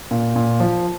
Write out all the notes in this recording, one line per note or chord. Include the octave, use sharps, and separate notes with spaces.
A#2
A#2
F3